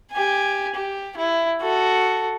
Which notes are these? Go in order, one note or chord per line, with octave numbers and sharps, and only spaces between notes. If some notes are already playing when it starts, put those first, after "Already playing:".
G4 G#5
G4
E4
F#4 A4